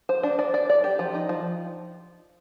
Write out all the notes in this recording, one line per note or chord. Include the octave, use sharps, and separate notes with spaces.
C5
D4
D5
D5
D5
G4
F3
D#4
F3